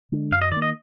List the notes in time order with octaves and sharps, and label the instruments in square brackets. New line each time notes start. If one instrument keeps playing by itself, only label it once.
[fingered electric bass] D3 G#3 D4
[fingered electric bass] F#2 [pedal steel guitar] F5
[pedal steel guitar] D#5
[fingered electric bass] D#3 [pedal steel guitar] D5
[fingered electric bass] A#3
[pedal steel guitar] D#5